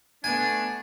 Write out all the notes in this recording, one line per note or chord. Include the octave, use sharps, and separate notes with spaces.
A3 B3 D4 G#5